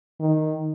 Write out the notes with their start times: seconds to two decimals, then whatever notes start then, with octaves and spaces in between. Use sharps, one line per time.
0.20 D#3